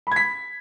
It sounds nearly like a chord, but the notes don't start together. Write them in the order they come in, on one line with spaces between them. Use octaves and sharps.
B5 G#6 B6